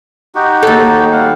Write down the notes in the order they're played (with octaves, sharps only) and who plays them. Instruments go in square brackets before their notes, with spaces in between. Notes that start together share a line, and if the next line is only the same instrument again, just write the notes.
[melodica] D#4 F#4 G4
[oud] D#2 A4
[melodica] G3 F5 F#5